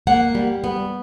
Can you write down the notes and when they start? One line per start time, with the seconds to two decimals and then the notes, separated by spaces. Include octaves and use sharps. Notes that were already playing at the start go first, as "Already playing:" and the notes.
0.07 A#3 F#5
0.35 G3
0.64 B3